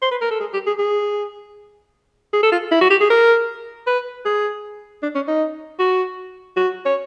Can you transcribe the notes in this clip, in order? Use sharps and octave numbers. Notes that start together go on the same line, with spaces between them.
C5
B4
A#4
A4
G#4
G4
G#4
G#4
G#4
A4
F4
E4
F#4
G4
G#4
A#4
B4
G#4
D4
C#4
D#4
F#4
F#4
C#5